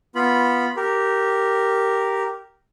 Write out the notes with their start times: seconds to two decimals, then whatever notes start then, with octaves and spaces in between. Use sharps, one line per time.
0.15 B3 F4 B5
0.77 G4 A#4